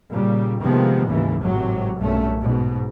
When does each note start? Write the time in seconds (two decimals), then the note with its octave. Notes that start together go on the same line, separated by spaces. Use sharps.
0.11 A#2 C#3 G3
0.63 C3 D#3 F3 G#3 A#3 B3
1.09 D#2 G#2 C#3 E3
1.43 G#1 A2 C3 F#3
1.98 B1 G2 A#2 A3 C#4
2.40 G#2 B2